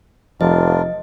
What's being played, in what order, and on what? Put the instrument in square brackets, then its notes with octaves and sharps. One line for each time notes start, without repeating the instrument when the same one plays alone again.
[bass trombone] F1 [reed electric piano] F3 [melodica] D4 F4 A#4 [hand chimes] D#5